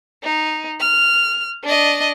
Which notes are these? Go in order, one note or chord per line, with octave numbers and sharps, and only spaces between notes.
D#4
F6
D4 D#5